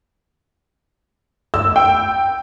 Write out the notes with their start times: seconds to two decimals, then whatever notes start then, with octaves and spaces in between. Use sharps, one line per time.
1.54 E6
1.76 G5